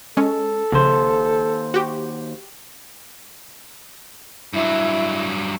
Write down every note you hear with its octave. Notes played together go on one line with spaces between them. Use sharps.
G#3 C#4 A4
A#1 D#2 C#3 C5
F#4 G4
G2 F#3 E4